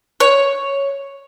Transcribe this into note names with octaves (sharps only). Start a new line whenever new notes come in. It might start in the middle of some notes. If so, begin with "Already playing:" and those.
C#5